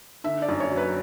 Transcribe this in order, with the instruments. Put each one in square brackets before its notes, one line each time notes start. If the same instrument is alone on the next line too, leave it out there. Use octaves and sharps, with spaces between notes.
[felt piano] D3 E5
D5
F#2
C#5
F#3
B4